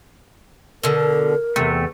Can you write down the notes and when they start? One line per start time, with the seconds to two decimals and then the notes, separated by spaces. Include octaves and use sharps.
0.83 B2 D3 A#4
1.56 E2 C3 A3